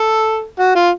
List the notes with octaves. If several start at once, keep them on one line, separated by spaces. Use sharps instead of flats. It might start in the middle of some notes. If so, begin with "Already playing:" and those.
Already playing: A4
F#4
F4